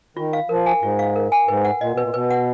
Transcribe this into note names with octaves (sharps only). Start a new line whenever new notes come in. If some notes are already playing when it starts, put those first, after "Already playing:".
D#3 F4
F5
F3 A#4
G#5
G#2 F4
F5
A#4
G#5
G#2 B4
F#5
A#2 D#5
B2
B4
A#2
B2 B4
F#5